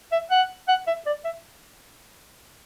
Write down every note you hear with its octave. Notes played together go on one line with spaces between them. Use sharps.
E5
F#5
F#5
E5
D5
E5